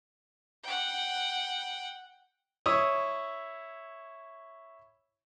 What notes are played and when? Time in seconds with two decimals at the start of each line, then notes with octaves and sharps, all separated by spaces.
0.64 F#5 G5
2.66 E4 C#5 D#6